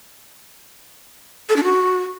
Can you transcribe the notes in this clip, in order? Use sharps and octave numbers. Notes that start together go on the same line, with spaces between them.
A4
D4
F#4